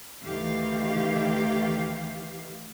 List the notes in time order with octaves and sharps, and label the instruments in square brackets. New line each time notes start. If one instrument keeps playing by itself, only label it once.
[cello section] D2 D#3 E3 A3 G4 F5